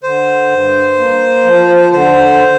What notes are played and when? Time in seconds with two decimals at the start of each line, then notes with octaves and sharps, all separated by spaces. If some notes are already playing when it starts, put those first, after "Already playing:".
0.03 D3 C5
0.51 G2
0.98 A#3
1.45 F3
1.93 D3 C5